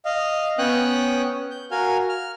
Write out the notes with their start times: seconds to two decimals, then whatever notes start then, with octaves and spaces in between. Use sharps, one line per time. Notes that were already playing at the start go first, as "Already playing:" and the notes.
0.05 D#5 F5
0.58 B3 C#4 C#5 G5 D#6 F#6
1.51 G6
1.71 F#4 A#4 F5 G#5 F6
2.09 F6